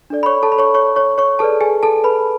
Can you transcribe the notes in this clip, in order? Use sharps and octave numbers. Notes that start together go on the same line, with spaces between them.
D4 A4 D5
B5
C#5 C#6
A4 A5
B5
C#5 C#6
C#5 C#6
C#5 C#6
C#5 C#6
G#4 A4 B4 D5 A5
G#4 G#5
A4 A5
B4 B5